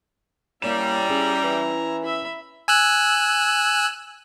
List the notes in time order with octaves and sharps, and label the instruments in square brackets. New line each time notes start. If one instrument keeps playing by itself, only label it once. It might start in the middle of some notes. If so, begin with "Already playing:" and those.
[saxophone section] G3 [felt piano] A#3 A#4 E7 [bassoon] C#4 [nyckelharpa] E4 A#5
[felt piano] C#4 [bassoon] G#4
[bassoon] E3
[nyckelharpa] E5 B5
[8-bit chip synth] G#5 E6 F#6